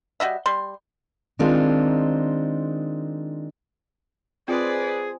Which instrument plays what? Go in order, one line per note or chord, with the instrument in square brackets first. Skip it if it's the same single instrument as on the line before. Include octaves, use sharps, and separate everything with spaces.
[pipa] G3 F#4 D#5 E5
G3 C6
[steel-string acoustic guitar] D#3 G#3 C4 D4 D#4 F4
[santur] F3 G#3 [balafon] C4 F4 [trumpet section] G#4 [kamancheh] B4 D5